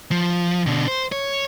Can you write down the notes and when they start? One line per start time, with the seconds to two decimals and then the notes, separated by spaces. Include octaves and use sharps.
0.12 F3
0.66 B2 D3
0.88 C5
1.12 C#5